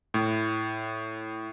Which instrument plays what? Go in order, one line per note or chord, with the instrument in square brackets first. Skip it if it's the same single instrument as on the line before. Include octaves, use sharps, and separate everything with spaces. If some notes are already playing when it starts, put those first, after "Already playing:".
[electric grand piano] A2